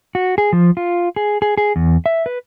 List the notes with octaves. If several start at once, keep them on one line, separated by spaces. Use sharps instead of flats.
F#4
G#4
F3
F4
G#4
G#4
G#4
E2
E5
B4